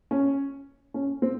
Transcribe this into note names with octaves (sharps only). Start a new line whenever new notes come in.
C#4
C#4
C4